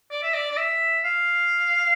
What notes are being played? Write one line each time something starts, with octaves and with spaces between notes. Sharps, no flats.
D5
E5
D5
D5
E5
F5